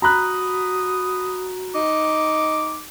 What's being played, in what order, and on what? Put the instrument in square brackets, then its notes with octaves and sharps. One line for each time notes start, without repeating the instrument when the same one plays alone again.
[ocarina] F#4 [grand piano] A#5 B5 F#6 [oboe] D#6
[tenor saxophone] D#4 [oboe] D6